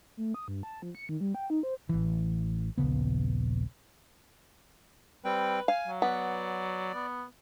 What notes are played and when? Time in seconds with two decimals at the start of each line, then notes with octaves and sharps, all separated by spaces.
0.17 A3
0.34 D#6
0.48 G2
0.63 A5
0.82 F3
0.95 C#7
1.09 D#3
1.21 G3
1.35 G5
1.50 D#4
1.63 C5
1.89 A1 E3
2.78 D#1 A#1 C#3 B3
5.25 G3 C4 B4 G5
5.68 F5 G#5
5.87 F#3
6.02 B3 D5
6.94 B3